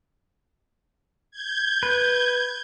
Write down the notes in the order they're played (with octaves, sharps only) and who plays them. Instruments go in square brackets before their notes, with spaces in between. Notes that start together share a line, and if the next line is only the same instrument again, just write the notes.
[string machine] G6 G#6
[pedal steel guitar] B4